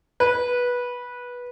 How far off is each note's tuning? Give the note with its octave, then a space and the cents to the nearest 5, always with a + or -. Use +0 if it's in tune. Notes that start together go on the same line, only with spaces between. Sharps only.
B4 -15